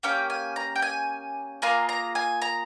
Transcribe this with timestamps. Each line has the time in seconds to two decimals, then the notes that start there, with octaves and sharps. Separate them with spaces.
0.03 A#3 C#4 G4 G5
0.30 G#5
0.56 A#5
0.76 G5
0.82 G#5
1.62 A#3 F4 G#4 A#5
1.89 A#5
2.15 G#5
2.42 A#5